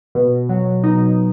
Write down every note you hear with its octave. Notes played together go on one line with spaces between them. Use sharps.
B2
F#3
B2 D#4